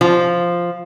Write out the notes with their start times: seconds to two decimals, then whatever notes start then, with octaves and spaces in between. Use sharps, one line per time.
0.01 F3